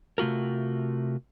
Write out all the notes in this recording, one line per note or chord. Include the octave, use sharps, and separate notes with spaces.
C3 A3 F4 F#4 A#4